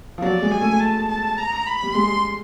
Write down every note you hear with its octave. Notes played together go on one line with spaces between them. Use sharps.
F3
F#3 D5
G#3
G#5
A3
A5
A5
A#5
B5
G3
G#3 C6